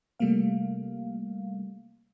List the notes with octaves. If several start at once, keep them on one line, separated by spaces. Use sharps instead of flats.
C3 G3 A3 A#3 F5